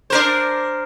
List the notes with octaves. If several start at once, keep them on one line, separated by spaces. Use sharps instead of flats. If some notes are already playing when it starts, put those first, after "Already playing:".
D4 A#4 C5